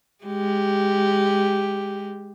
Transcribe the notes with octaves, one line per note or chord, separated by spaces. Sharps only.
G#3 G4